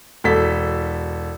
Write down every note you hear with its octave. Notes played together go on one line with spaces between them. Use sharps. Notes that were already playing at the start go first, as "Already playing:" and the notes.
E1 A4 B6